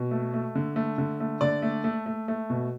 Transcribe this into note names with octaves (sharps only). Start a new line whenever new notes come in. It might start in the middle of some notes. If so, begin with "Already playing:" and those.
Already playing: B2
A3
A3
D3
A3
D3
A3
D3 D5
A3
A3
A3
A3
B2